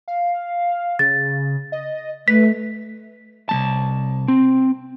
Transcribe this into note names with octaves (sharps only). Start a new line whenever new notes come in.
F5
C#3 A6
D#5
A3 B4 B6
C2 G#3 A5
C4